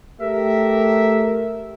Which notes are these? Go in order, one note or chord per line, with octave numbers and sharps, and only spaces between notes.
A3 G4 A#4 E5